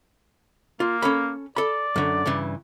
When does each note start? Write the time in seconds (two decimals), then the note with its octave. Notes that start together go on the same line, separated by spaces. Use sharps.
0.80 A#3 F4
1.02 C#4 A4 B5
1.56 A4 D5 B5
1.96 F#2 D3
2.26 G2 C#3 E3